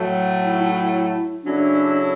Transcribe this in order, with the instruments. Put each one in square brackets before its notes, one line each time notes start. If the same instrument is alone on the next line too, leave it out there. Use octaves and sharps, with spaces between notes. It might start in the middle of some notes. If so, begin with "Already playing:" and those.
Already playing: [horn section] A2 F#3 A3
[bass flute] E4
E4
[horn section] C#3 F#3 C#4 E4 A4 [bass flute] D4